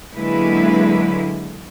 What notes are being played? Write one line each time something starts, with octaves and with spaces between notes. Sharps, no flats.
D3 F#3 G#3 A#3 E4 B4